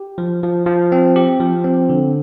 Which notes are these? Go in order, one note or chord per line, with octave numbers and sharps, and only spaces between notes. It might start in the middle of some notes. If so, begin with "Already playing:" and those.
Already playing: G4
F3
F3
F3
C4
G4
F3
C4
D3